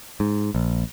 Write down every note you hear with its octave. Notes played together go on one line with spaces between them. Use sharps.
G#2
A#1